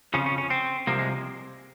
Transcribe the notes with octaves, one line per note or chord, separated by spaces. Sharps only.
F2 C#3 F3 C#4
C#4
C#4
C4
C2 C3 F3 A#3
G#3